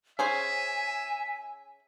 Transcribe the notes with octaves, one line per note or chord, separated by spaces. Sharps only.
C#4 G#4 C5 E5 G#5